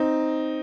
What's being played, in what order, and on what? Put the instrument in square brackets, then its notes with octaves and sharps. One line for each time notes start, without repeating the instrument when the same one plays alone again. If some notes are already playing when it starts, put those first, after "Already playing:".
Already playing: [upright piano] C4 D#4